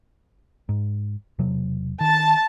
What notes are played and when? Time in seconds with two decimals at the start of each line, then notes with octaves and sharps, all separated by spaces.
0.69 G#2
1.39 E1 C3 F#3
2.01 D#3 A5